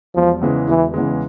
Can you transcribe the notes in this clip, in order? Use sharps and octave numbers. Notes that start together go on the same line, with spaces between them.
E1 F3
E2 C#3 E3 G#3
E1 E3
E2 C#3 E3 G#3